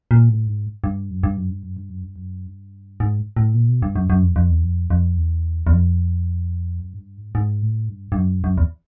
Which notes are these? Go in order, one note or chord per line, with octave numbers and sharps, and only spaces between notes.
A#2
A2
G#2
G2
F#2
G2
F#2
G2
F#2
G2
F#2
G2
F#2
G2
G#2
A2
A#2
B2
G2
F#2
F#2
F2
F2
E2
F2
F2
E2
E2
F2
F#2
G#2
G2
G#2
G#2
A2
G2
G2
F#2
F#2
E2